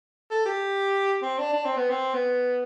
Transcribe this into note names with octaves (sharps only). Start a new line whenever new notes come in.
A4
G4
C4
D4
D4
C4
B3
C4
B3